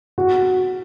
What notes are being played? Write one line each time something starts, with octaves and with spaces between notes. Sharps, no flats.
F#4